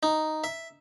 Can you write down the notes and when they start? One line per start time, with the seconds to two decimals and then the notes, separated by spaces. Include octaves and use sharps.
0.03 D#4
0.44 E5